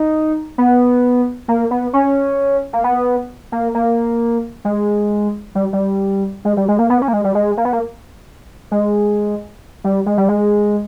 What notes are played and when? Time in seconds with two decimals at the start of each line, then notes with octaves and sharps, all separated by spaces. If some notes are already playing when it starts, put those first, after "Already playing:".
Already playing: D#4
0.58 B3
1.48 A#3
1.71 B3
1.93 C#4
2.73 A#3
2.84 B3
3.52 A#3
3.75 A#3
4.65 G#3
5.55 G3
5.73 G3
6.45 G#3
6.57 G3
6.68 G#3
6.79 A#3
6.90 B3
7.02 C#4
7.08 A#3
7.13 G#3
7.24 G3
7.35 G#3
7.57 A#3
7.65 B3
7.73 A#3
8.71 G#3
9.84 G3
10.06 G#3
10.18 G3
10.29 G#3